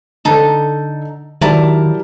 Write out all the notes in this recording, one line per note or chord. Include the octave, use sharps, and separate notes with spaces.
D3 D#4 A4 A5
D#3 F#3 E4 G4 A#4 D5 A5